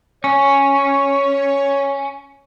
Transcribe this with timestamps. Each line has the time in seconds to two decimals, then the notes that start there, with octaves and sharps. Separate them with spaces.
0.24 C#4 C#5